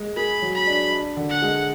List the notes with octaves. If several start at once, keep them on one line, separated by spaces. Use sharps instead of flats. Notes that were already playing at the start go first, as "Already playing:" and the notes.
Already playing: G#3
G#4 B5
F#3
B5
D4
D4
D3
F#5
G#3